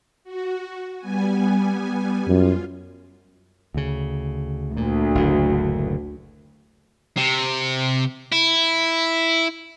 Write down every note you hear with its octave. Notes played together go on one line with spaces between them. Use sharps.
F#4
G3 B3 G#5
F#2 F4
D2 C#3
D2 A#2
F#1 A2 D3
C3
E4